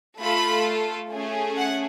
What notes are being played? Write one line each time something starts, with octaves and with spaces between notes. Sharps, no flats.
A3 F4 A4 B5
A3 C#4 G#4
F#5